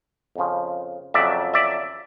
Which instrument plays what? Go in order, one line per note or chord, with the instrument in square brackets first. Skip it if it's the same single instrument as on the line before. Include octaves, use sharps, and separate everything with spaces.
[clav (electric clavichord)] F2 C#3 F3
F2 C#3 F#3 D5 E5
D5 E5